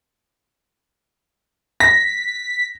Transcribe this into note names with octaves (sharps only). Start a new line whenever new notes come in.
A#6 B6